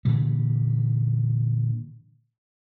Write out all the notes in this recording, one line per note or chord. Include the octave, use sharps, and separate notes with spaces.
A#2 D3 E3 G3